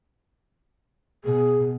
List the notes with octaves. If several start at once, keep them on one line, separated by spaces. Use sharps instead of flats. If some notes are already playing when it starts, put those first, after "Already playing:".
B2 G#4